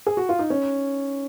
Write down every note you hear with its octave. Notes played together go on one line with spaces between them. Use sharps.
G#4
F#4
F4
D#4
C#4